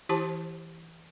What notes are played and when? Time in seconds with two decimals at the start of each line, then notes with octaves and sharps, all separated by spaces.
0.09 E3 E4 G4 C5 A5